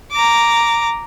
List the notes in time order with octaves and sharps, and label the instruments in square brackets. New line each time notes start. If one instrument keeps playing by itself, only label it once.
[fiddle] A#5 D6